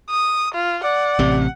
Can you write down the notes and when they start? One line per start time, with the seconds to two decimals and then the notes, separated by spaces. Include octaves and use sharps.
0.10 D#6
0.54 F4
0.84 D5 F#5
1.19 A1 C3